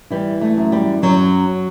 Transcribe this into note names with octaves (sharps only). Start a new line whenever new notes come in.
E3 G3
A3
F#2
G3
F#2 F#3